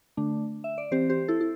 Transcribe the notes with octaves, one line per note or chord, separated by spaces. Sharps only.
D3 A3 D4
E5
D5
E3 C4 G4 C5
G4 C5
E4 A4
E4